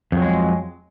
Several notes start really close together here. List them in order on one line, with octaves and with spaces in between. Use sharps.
F2 F#3 G#3